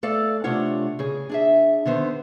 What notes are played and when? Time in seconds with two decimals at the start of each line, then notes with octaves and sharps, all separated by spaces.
0.03 A3 A4 D5 F5
0.44 C3 A3 D4 F4 C#5 F#5
0.99 C#3 G#4
1.29 D4 G#4 E5
1.85 D3 D#3 B3 C5